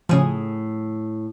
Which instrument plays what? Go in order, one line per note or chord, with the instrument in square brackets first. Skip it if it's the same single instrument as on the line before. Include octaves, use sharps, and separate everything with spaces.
[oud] A2 G#4 [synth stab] C#3 F3